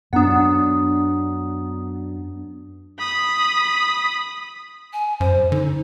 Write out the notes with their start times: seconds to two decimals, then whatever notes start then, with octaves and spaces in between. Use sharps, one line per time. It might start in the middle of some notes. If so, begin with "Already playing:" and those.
0.13 F#2 B3 D4 F#5 A#5 D#6
2.99 B5 D#6
4.93 G#5
5.20 F#2 C5
5.52 D3 D#4